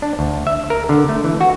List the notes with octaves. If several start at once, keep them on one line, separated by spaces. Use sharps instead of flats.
D4
D2
E5
A#4
D3
A3
E3
F#4